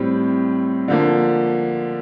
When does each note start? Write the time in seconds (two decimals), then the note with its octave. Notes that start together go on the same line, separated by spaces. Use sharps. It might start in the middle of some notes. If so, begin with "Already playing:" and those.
Already playing: A2 G3 C4
0.88 D3 F3 A#3